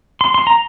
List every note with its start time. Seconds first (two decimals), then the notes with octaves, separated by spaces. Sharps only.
0.21 C6
0.34 C6
0.47 A#5